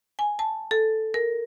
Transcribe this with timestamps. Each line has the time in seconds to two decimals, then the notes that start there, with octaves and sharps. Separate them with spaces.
0.19 G#5
0.39 A5
0.71 A4
1.14 A#4